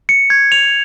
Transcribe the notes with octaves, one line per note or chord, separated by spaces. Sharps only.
C#7
G#6
F7